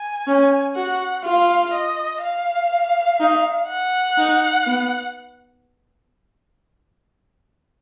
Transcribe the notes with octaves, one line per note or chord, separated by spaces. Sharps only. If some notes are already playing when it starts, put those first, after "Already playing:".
Already playing: G#5
C#4
F#4 F#5
F4 F5
D#5
F5
D#4
F#5
D#4
B3